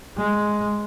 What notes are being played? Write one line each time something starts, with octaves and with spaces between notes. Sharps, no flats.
G#3